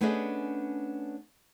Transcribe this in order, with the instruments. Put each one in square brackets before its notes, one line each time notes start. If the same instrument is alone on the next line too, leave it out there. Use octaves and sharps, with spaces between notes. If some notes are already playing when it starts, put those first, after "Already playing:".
[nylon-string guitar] A3 B3 C#4 D4 G#4 D#5